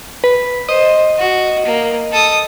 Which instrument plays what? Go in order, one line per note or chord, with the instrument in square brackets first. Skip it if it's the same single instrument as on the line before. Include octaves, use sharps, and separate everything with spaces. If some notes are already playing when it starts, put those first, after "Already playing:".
[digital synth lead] B4
[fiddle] C5 [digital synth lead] D#5
[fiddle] F#4
A#3
A4 D#6